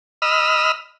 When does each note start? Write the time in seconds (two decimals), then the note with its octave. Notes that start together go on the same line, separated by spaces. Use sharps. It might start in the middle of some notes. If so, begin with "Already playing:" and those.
0.22 D#5 B5 E6 F6